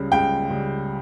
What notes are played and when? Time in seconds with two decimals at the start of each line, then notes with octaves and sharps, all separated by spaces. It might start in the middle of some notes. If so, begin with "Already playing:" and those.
Already playing: C#2 C#3 G3
0.12 C#2 G5
0.50 C#3 G3